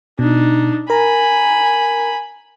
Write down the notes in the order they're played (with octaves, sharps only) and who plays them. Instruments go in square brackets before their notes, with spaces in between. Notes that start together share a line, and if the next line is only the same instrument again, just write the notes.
[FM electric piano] B2 [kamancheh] D4 D#4
[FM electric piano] A#4 A#5 [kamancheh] G#5 B5